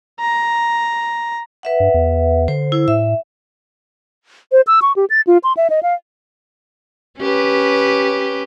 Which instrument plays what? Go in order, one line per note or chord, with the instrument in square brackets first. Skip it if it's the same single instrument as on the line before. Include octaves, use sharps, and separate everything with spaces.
[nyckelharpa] A#5
[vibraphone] B4 E5 F#5
[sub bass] G2
E2
[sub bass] D3 [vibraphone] C5
[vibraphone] E4 C5 E6
[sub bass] A2 [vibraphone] E5
[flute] C5
E6
C#6
G4
A6
F4
C6
E5
D#5
F5
[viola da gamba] C#4 G4 B4